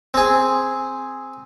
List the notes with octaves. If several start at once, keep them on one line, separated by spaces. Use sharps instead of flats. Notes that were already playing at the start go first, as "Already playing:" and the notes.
C4 G#4